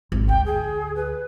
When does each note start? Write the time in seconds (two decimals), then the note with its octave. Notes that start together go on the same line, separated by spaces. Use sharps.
0.12 G#1
0.29 D2 G5
0.45 G#4
0.95 B4